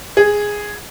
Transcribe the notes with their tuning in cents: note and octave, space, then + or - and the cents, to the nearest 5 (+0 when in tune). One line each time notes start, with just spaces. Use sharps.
G#4 -5